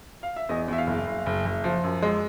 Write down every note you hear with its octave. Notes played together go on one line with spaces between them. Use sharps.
F5
E5
E2 D#5
E2 E5
F5
F#1
F#1
F#1
F#1
F3
F#2
G#3